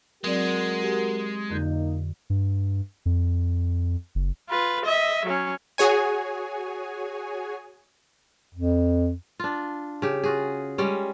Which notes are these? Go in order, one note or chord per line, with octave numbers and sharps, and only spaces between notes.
F#3 G#3 C4 F#4 A#4 D5
G4
F2 D3 A#3 D#4 G6
G2
F2
F#1
F4 B4
D#5 E5
F#3 C#4
F#4 G#4 C#5 G#5
F2
D4 F4
C#3 G4
F4 F#4 G#4
G3 G#3 C#4